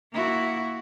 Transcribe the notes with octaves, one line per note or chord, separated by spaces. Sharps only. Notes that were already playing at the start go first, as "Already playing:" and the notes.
A#3 E4 F#4